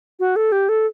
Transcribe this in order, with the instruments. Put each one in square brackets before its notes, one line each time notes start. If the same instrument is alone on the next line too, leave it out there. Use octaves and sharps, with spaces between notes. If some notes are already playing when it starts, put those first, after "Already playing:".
[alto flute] F#4
A4
G4
A4